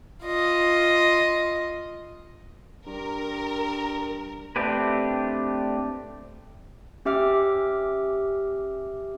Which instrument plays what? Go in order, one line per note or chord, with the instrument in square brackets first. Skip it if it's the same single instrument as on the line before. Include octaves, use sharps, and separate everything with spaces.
[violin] F4 D#5
[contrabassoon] G2 [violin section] A#4
[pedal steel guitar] A3 C4 D4 G4 B4
[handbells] C#4 G4 E5 D6 F6